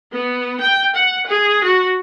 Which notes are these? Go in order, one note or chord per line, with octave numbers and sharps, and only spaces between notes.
B3
G5
F#5
G#4
F#4